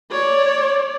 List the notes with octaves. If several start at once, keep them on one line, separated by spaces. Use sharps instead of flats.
C#5 D5